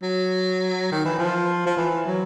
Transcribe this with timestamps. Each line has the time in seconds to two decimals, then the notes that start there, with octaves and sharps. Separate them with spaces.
0.02 F#3
0.92 D#3
1.05 E3
1.18 F3
1.66 F3
1.77 E3
2.06 F#3